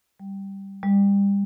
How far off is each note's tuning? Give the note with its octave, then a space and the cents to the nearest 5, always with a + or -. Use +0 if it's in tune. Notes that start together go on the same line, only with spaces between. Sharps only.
G3 +0
G3 +30